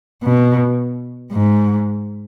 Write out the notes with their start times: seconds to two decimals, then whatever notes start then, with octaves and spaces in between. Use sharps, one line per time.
0.23 B2
1.33 G#2